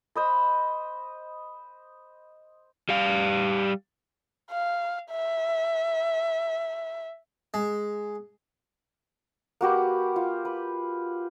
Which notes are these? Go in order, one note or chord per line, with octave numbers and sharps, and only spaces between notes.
C5 D#5 B5
G3 F5
F5
E5
G#3
A#3 F#4 G4 B4
F4
B4